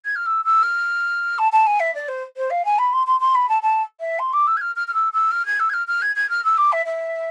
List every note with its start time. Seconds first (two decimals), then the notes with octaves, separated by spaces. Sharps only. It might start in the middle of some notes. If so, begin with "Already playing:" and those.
0.05 G#6
0.16 F6
0.26 E6
0.45 E6
0.63 F6
1.38 A5
1.52 A5
1.67 G#5
1.80 E5
1.95 D5
2.08 C5
2.37 C5
2.50 F5
2.65 G#5
2.78 B5
2.93 C6
3.07 C6
3.20 C6
3.35 B5
3.49 A5
3.62 A5
4.00 E5
4.19 C6
4.33 D6
4.47 E6
4.57 G#6
4.61 F6
4.76 F6
4.88 F6
4.94 E6
5.13 E6
5.31 F6
5.46 G#6
5.60 E6
5.69 G#6
5.73 F6
5.87 F6
6.02 G#6
6.16 G#6
6.30 F6
6.44 E6
6.57 D6
6.72 E5
6.86 E5